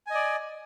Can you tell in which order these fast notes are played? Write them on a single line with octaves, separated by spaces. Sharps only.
G#5 D#5 D5